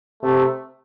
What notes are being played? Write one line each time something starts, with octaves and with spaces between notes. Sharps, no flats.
C3 A3